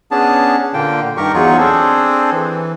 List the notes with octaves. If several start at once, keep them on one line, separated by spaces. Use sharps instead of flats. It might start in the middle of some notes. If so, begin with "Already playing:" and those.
B3 C#4 D4 G#4 A5
A#2 D3 A#3 G5
G2 D#3 G4 A#4 C#6
E2 F#3 D#4 F4 G#4 C#6
C4 D4 G#4 A4 C5
E3